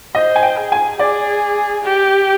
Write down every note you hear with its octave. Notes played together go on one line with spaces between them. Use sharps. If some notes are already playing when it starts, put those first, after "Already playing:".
C5 D#5
G#5
G5
G#4
G#5
G#4 D5
G4